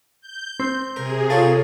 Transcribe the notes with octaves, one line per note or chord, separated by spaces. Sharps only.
G6
C4
C3 G#4 A#4
F4 A4 A#4 C#5